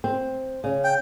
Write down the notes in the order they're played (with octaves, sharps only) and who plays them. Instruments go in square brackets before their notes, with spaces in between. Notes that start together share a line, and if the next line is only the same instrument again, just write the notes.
[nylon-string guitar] C4
C#3
[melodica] G5